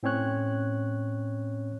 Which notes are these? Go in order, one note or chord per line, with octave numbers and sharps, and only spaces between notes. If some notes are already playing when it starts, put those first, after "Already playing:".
A2 C4 C#4 C#5 F#6